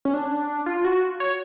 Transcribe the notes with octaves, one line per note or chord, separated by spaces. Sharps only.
C#4
D4
F4
F#4
C#5